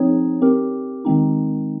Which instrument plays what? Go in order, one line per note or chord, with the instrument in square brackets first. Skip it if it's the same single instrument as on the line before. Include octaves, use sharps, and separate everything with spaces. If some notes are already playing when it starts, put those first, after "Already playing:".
Already playing: [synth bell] F3 C4 D#4 G#4 C#5
C4 G4 A#4
D#3 G#3 C4 D#4